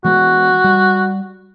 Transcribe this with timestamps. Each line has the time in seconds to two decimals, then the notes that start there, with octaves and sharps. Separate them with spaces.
0.04 E3 G#3 B3 F#4
0.64 G3